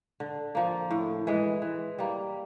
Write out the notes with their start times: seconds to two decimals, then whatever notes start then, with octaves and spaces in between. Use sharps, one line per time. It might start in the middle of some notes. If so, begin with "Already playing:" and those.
0.20 D3
0.55 F3 A#3
0.91 A2
1.27 E3 G#3
1.62 E3
1.98 G3 A#3